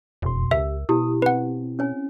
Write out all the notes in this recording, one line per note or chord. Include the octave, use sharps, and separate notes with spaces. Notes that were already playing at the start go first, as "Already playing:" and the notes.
E1 F2 B2 C6
C#2 G4 A#4 E5
B2 E4 G4 D#6
C4 B4 F#5
C#4 C#5 G#5